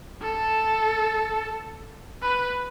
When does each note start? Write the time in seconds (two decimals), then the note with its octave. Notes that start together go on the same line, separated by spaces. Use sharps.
0.22 A4
2.23 B4